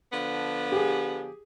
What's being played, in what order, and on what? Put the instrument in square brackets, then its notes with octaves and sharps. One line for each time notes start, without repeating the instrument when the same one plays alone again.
[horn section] D3 F3 B3
[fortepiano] G4 G#4